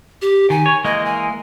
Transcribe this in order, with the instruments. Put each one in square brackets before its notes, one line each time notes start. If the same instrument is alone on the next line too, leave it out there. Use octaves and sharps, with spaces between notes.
[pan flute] G4
[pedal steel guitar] D#3 [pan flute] G#5
[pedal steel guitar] C#5
[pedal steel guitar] E3 G#3 A#3 [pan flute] D#5
[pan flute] G#5